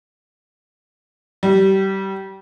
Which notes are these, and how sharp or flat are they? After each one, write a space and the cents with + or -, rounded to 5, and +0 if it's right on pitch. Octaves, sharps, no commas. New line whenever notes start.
G3 -25